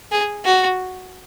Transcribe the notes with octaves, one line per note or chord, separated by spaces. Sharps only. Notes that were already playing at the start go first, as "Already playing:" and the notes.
G#4
F#4